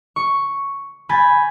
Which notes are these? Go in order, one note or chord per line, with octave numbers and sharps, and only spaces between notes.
C#6
G#5 B5 G6 A6